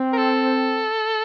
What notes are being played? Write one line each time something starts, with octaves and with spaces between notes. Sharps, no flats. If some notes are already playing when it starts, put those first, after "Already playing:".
Already playing: C4
A#4
A4